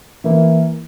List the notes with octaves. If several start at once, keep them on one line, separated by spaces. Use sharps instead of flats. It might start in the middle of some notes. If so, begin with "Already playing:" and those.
E3 A#3 E4